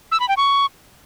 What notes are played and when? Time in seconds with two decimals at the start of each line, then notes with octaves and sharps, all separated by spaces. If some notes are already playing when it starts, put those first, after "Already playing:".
0.12 E6
0.20 B5
0.29 G5
0.37 C#6